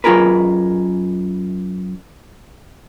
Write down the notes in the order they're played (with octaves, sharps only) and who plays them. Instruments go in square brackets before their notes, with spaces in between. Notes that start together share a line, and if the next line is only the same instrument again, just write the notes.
[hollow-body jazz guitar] F#2 F4 G#4 A#4 B4